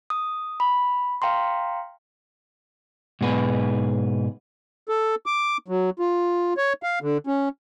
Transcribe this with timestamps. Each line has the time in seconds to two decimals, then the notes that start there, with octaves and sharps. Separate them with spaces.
0.10 D#6
0.60 B5
1.22 F5 G5 A#5 C6
3.21 G#2 B2 G#4 B4
4.89 A4
5.26 D6
5.68 F#3
5.99 F4
6.57 C#5
6.83 F5
7.02 D3
7.27 C#4